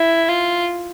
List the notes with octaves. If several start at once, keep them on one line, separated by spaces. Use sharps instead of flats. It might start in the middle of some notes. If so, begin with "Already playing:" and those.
Already playing: E4
F4